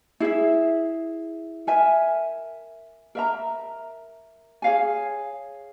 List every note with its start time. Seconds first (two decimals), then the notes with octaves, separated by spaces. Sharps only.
0.20 E4 G#4 E5
1.67 A#4 E5 G#5
3.15 A#4 E5 A#5
4.62 G#4 C#5 F5 G#5